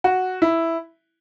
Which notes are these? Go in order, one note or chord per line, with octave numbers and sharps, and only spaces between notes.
F#4
E4